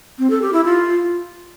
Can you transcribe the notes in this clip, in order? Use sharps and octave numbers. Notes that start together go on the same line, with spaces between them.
C4
A4
G4
E4
F4